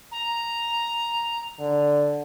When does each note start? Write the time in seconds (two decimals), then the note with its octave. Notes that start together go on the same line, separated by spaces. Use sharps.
0.12 A#5
1.59 D3